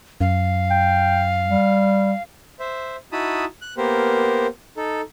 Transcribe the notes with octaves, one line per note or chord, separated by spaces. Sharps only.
F#2 F5
G5
G3
C5 E5
D#4 E4 F#4 A5 B5 D#6
F#6
A#3 B3 G4 A#4 C5
D#4 A4